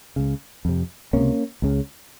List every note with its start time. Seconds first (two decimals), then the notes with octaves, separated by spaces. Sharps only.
0.16 C#2 C#3
0.65 F2 C3
1.13 C#2 C3 A#3 C#4
1.62 C#2 C#3